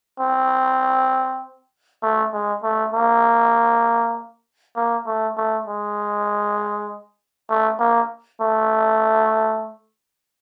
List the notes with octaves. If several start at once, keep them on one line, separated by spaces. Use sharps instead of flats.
C4
A3
G#3
A3
A#3
A#3
A3
A3
G#3
A3
A#3
A3